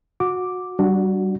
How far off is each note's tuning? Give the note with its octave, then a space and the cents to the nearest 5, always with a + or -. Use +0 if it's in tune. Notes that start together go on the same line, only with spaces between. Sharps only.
F#4 -20 D6 +0
G3 -25 D4 +0 F#4 +0